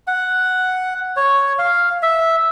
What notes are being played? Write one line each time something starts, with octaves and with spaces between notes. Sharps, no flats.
F#5
C#5
F5
E5